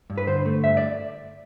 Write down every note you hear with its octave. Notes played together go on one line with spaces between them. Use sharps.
G2
B4
D3 C5
A3
G2 E5
D5